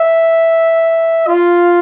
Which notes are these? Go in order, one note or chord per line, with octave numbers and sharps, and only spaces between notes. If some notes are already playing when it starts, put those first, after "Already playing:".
Already playing: E5
F4